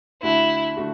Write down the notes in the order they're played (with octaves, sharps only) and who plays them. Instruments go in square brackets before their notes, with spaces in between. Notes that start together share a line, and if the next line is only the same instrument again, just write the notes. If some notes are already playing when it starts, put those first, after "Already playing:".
[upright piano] D2 D3 A3 F#4 [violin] E4
[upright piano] D3 A3 F#4